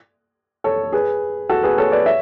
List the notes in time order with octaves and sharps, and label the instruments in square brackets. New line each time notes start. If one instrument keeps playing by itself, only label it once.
[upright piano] A4 C#5
G#4 B4
F#4 A4
G#4 B4
A4 C#5
B4 D5
C#5 E5